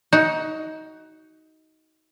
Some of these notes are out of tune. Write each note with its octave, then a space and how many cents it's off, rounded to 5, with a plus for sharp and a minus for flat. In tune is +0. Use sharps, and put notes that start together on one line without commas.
D#4 +20 F#4 +20